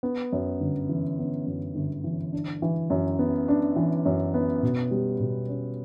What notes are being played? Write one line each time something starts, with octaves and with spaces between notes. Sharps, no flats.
B3
F#2
G1
E3
B3
F#2
G1
E3
D4
E3
F#2
B3
D4
E3
F#2
B3
B2
G3
B2
C#4